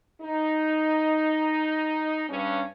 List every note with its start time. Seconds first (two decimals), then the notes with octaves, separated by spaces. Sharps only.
0.22 D#4
2.30 G2 C#4